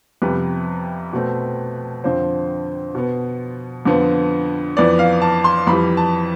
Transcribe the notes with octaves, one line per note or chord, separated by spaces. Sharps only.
F2 C3 G3 B3 B4
B2 A3 C4
F2 D3 F3 C4 C5
B2 B3
F2 D3 F3 B3
F2 E3 B3 D5
F5
A5
C6
F2 E3 G3 B5
A5